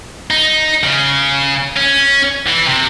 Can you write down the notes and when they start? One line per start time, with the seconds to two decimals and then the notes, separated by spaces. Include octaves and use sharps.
0.30 D#4
0.84 C#3
1.76 C#4
2.46 E3
2.66 C3